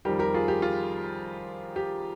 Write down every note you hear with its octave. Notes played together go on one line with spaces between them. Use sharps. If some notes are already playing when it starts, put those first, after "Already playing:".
F2 D#3 G3 G4 A#4
G4 A#4
F4 G#4
G4
F4
G4